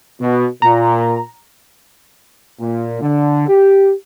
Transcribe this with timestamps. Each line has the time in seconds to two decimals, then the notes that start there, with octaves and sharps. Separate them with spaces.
0.20 B2
0.62 A#2 A#5
2.60 A#2
3.01 D3
3.48 G4